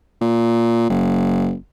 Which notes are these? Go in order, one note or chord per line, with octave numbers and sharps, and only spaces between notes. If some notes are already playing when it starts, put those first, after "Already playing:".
A#2
F#1